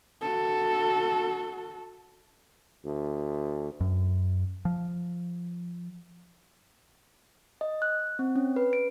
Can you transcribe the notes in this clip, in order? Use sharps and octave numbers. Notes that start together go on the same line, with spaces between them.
F#4 A4
D2
F#2
F3
D#5
F#6
C4
C#4
B4
D7